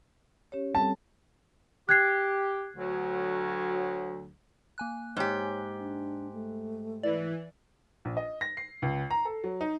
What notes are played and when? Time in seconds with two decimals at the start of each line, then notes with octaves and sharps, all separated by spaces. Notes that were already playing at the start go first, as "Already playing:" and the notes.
0.52 C#4 G4 C#5
0.75 G3 C4 A4 A5
1.89 G4 F#6 G#6 C7
2.76 D2 F#3
4.78 A#3 G#5 F#6
5.16 G#2 G4 C#5
5.80 D4
6.33 A3
7.03 E3 D5
8.05 A#1
8.17 D#5
8.41 A#6
8.57 C7
8.82 C#2
9.11 A#5
9.25 A4
9.44 F#3
9.61 D#4